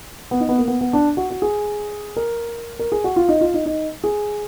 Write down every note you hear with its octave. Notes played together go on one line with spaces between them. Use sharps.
B3
D#4
B3
A#3
B3
B3
D4
F#4
F#4
G#4
A#4
A#4
G#4
F#4
F4
D#4
F4
D#4
D#4
G#4